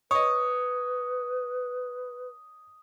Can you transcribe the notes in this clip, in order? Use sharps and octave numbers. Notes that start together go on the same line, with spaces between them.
B4 C#5 D#5 D#6